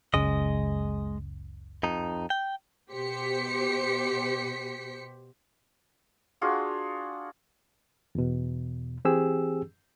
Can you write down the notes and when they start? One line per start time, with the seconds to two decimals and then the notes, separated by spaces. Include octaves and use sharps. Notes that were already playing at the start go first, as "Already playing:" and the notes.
0.14 F#1 C#2 G#3 C#4 D#5
1.83 F2 D#4
2.30 G5
2.91 B2 G4 C5 B6 C#7
6.41 D4 F4 F#4 G#4
8.15 E2 B2
9.05 E3 C4 G4 G#4 E6